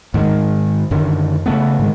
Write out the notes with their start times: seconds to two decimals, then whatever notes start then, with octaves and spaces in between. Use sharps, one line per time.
0.14 G#2 D#3 G#3
0.91 F#2 D3 D#3
1.46 C#3 A3 B3
1.79 G#2 D#3 G#3